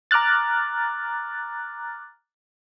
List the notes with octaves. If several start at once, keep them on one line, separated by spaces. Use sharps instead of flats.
A#5 D6 F6 F#6 A6